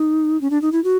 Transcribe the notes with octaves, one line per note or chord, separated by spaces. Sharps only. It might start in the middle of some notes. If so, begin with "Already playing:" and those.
Already playing: D#4
C#4
D4
D#4
E4
F#4